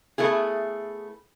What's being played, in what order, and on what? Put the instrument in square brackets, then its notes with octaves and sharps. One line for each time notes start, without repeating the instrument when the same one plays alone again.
[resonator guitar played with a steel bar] A3 B3 E4 G#4